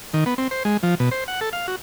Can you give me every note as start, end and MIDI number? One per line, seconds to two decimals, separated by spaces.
0.14 0.24 51
0.26 0.34 59
0.38 0.48 60
0.51 0.63 72
0.65 0.77 56
0.83 0.95 53
1.00 1.10 47
1.11 1.24 72
1.28 1.40 78
1.41 1.49 69
1.53 1.67 77
1.68 1.76 66